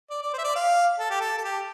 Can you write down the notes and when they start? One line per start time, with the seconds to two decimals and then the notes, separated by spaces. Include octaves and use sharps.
0.10 D5
0.22 D5
0.34 C5
0.38 E5
0.44 D5
0.56 F5
0.99 A4
1.10 G4
1.20 A4
1.38 A4
1.44 G4